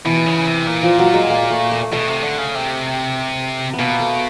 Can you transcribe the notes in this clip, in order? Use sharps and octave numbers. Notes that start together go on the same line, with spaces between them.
B2 E3
C#3
C3
A#2
F3
F#3
G#3
A#3
A3
A3
B2 A3
C3
D3
C#3
C3
B3
B2 A#3
A3